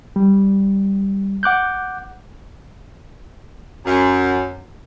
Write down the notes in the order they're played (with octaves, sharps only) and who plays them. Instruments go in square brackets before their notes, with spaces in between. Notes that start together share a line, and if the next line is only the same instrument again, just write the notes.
[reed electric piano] G3
F#5 D6 F#6 G6
[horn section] F#2